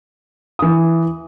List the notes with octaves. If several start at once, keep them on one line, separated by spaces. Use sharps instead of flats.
E3 D#6